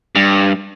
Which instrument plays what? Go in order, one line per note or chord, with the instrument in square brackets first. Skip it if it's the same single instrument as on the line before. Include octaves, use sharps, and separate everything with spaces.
[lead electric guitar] G2